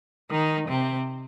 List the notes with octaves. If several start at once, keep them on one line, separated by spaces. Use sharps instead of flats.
D#3 D#4
C3 C4